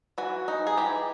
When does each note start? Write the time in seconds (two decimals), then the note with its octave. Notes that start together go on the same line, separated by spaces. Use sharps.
0.18 E3 F#4
0.48 D#4
0.67 G#4
0.77 E3 G4